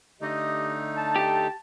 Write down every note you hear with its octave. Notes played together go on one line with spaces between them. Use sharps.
D3 A3 D#4 G4 D#5
A5
G4